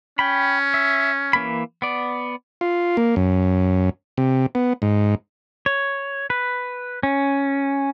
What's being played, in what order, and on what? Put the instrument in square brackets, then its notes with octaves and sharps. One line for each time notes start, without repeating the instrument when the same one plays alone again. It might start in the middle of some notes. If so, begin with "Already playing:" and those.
[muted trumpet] C#4 [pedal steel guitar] G5 B5
[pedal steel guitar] E5
E3 A#3 B5
B3 D5
[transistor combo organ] F4
A#3
F#2
C3
B3
G#2
[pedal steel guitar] C#5
B4
C#4